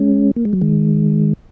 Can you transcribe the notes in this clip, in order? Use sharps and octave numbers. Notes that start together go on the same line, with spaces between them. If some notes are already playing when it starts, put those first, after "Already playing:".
Already playing: G#3 C#4
A#3
G#3
F#3
D#3 G#3